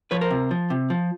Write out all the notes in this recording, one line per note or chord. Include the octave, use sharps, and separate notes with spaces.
F3 B4 C#5
A#4 C5
C3
F3
C3
F3